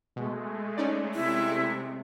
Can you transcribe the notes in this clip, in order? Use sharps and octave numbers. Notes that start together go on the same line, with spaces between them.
B2 G#3 A3
C#4 D#4 D5
C3 E4